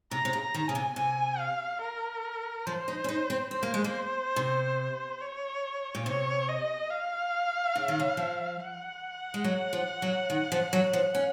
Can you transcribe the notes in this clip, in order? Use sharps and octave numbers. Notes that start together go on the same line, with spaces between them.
C3 A#5
C3
C#3
A#5
D#3
C#3 G#5
C3
C3 G#5
F5
A#4
F3 C5
D#4
C#4
D#4
C4
C4 C5
A#3
G#3
A#3
C3
C#5
A#2
C3 C#5
D#5
F5
C#3
D#3
C#3
F3
F#5
G#3
F#3
F3
F#3
D#3
F3
F#3
F3
C#4